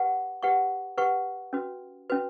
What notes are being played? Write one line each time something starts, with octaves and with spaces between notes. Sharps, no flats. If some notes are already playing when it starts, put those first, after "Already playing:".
Already playing: G4 B4 F#5 C#6
G4 B4 F#5 C#6
G4 B4 F#5 C#6
C#4 F#4 B4
C#4 F#4 B4